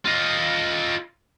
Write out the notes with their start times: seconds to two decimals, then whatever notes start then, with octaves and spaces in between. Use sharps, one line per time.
0.06 F4 D#5